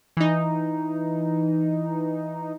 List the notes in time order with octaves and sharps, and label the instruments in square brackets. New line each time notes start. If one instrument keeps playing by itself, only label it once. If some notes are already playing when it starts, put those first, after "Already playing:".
[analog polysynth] E3 D#4